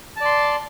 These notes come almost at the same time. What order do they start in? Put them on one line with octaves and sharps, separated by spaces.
A5 D5 C6